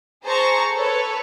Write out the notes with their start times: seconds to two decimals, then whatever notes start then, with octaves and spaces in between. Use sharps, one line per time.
0.23 G#4 C5 A5 A#5 C#6
0.72 A4 B4 C#5